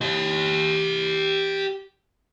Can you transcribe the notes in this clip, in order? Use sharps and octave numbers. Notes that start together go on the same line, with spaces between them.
G4 D#5